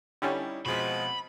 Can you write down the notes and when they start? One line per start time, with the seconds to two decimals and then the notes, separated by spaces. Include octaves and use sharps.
0.22 D3 G3 C#4 D#4 E4 G4
0.66 B2 F3 G#3 C4 F#4 B5